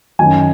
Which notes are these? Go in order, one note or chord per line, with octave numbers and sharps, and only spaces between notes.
F#2 D#3 F#3 G#5